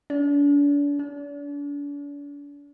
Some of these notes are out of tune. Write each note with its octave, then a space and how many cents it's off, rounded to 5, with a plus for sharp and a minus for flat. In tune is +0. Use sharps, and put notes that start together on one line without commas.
D4 -40
D4 -40